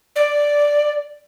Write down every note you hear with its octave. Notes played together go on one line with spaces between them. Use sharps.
D5